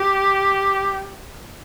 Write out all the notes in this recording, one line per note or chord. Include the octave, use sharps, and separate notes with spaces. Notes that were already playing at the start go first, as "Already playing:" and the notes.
Already playing: G4